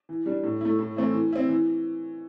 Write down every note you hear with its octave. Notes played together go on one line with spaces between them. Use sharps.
E3
G3 D4
A2
A3 E4
A2
E3 A3 C4 E4
E3
C4 E4
E3